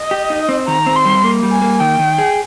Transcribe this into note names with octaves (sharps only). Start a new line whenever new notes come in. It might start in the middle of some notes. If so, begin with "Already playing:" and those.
Already playing: D#5
G4
D#4
C4
D#3 A#5
C4
C6
G3
A#3
G3
G#5
A#3
D#3 G5
D#3
G#4